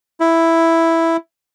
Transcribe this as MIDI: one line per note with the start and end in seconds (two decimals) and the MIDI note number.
0.20 1.17 64